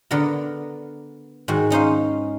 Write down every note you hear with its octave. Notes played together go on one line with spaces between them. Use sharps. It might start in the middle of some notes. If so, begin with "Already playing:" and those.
D3 B3 A4 A#4
G#2 D#3 F#4
C#4 D#4 C5 F5